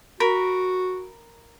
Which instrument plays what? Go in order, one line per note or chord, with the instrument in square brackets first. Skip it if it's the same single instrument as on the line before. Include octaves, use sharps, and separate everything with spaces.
[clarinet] F#4 [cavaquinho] A#4 B5